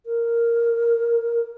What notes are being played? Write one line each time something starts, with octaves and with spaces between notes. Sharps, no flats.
A#4